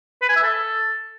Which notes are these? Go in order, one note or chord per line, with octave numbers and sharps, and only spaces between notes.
B4
G#5
E5
A4